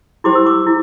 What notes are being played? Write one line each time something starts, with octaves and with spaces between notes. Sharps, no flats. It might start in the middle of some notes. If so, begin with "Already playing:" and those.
E4 G4 C5 D6
E6
D6
E4